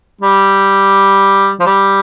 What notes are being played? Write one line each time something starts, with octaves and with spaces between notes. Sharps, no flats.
G3
F3
G3